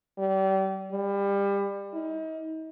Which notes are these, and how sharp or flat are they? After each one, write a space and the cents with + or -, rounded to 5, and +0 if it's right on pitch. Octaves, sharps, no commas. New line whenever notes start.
G3 -35
G3 +25
D#4 +40